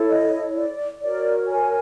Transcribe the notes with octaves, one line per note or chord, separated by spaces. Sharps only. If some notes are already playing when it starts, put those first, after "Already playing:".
Already playing: E4 A4 C#5
D#5
D5
F#4 A#4 C#5 D5
G#5